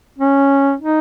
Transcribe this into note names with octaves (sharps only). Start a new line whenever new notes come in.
C#4
D#4